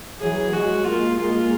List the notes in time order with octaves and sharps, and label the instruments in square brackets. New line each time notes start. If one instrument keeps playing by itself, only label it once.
[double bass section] E3 F#3 [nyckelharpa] G#4
[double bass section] F#3 G#3 [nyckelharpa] F#4
[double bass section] G#3 A#3 [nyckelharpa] F4
[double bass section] G#3 A#3 [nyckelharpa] F4